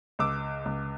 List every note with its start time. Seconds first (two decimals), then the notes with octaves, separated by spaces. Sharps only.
0.19 C#2 D6 E6
0.65 C#2